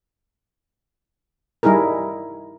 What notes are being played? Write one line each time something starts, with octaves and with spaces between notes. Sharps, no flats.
G3 D#4 E4 G#4 A#4